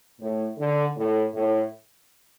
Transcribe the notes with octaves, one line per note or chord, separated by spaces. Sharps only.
A2
D3
A2
A2